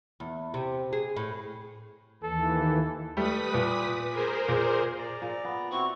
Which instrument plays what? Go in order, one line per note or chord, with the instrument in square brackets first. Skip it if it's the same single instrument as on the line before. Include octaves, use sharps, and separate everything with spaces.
[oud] E2
C3
G#4
A2
[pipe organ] D#2 E3 [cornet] A4
[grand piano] G3 A3 [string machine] B4 D#6 B6
[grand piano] A#2
[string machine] G#4 A#4 C5
[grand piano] A#2
[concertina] D5 A#5
[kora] A#2
B3
[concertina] C4 E4 F#4 [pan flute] C#6